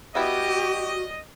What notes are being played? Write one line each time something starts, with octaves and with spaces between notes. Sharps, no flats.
G3 B3 E4 F#4 G4 D#5